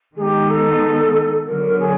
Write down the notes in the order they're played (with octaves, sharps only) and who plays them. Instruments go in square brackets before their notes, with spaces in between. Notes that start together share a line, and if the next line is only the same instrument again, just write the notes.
[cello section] D#3 G#3 B3 D#4 [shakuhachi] G4 G#4
[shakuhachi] A4
[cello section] D3 F#3 B3 [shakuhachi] A#4
[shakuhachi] G#4